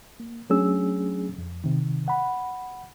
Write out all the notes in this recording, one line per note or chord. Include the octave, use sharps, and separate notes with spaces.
A#3
F#3 A3 C#4 D4 G#4 E6
F2
C3 D#3
F#5 B5